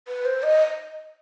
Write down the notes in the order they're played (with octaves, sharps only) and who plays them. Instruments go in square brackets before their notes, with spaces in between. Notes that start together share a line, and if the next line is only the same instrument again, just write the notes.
[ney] B4
C5
D#5